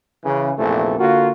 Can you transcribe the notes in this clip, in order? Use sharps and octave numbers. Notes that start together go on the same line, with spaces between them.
C#3 E3
A#1 E2 C3 E3 A3
D3 A#3 F4 F#4